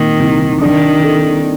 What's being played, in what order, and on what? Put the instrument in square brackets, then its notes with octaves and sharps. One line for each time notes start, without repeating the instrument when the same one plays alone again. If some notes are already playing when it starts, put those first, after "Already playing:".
Already playing: [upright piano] A#2 C4 [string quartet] D#3
[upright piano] C2
[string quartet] D#3 [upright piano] D4
[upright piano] A4